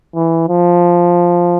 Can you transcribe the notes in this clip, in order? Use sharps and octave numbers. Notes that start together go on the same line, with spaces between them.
E3
F3